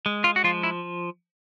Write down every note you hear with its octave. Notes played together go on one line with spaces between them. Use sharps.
G#3
F4
F#4
F3 F4
E4